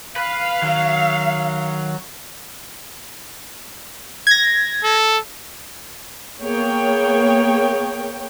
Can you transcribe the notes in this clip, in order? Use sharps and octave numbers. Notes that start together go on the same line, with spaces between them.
B4 F5
D#3 F#3
G#6 A#6
A4
A#3 B3 G#4 C#5 G5